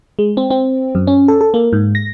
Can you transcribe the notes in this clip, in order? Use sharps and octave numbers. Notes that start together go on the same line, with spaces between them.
G#3
C4
C4
F#2
C#4
A4
A4
A#3
G#2
A#6